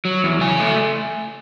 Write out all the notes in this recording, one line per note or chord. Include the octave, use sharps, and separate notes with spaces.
F#3
E2
C#3 G#5
A3